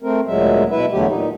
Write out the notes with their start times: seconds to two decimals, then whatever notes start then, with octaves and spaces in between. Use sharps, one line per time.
0.03 A3 C4 A#4
0.27 D2 A#2 F#3 G#3 E5
0.71 B2 E4 B4 E5
0.92 E2 D3 F#3 A3 G4
1.08 A#2 D#4